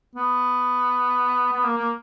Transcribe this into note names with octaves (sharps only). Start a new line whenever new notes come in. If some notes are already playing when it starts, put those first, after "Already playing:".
B3
B3
A#3
A#3